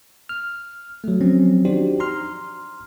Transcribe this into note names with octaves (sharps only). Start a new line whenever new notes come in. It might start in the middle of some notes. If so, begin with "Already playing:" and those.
F6
F#3 A3
D#3 F3 F#3 C4 C#4
D4 D#4 F#4 G4 C5 D5
A#5 C6 F6